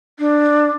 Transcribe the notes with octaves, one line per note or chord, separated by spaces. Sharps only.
D4